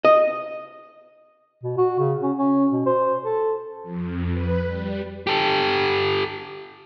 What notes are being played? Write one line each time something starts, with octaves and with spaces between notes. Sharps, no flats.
D#5
B2
F#4
C#3
C#4
C#4
B2
C5
A4
F2
B4
G3
G4 A4